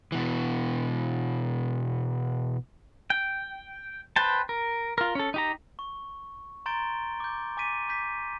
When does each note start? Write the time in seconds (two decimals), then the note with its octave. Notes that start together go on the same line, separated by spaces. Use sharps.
0.12 B2 E3
3.10 G5
4.16 B4 C5 G5 A5
4.49 A#4
4.98 F4 A#4
5.15 C#4 A4
5.34 D#4 G4 A#5
5.79 C#6
6.66 A#5 C6 G6 A6 D7 G7
7.20 D6 G6
7.57 G#5 D6 A6 B6 D#7
7.89 D6 G6 B6